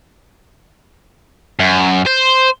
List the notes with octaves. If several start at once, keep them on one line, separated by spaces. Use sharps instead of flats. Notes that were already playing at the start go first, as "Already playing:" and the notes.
F#2
C5